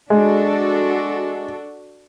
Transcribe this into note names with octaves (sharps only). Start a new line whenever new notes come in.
G#3 D4 F#4 A4